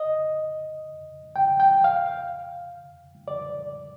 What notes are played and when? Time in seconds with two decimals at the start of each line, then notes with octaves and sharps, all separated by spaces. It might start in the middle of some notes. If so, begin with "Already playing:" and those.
Already playing: D#5
1.36 G5
1.60 G5
1.84 F5
3.28 D5